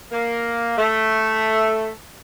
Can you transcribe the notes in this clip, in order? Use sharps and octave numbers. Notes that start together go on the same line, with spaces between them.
A#3
A3